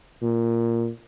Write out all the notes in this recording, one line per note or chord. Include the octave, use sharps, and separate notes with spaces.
A#2